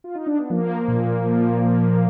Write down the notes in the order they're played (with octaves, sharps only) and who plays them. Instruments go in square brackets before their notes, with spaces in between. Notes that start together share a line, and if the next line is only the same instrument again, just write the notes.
[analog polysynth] F4
D#4
D4
B3
F3 A#3
A#2
F3
F3